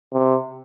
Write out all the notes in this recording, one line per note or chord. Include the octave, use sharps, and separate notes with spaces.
C3